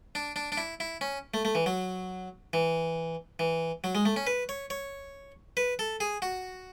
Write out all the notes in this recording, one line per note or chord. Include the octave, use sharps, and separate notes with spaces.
D4
D4
D4
E4
E4
C#4
A3
A3
E3
F#3
E3
E3
F#3
G#3
A3
C#4
B4
C#5
C#5
B4
A4
G#4
F#4